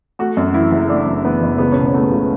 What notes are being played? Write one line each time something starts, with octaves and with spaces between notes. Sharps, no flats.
A3 F#4
F#2
E3 E4
F#1
A3 D4
F#2
E3 B3
F#1
C#2 B3
B2 C#4
B3
A3
C#2